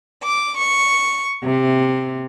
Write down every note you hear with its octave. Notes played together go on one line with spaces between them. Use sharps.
D6
C#6
C3